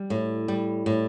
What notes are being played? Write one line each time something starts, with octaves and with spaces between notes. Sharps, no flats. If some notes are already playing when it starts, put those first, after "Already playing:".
Already playing: G3
A2
G3
A2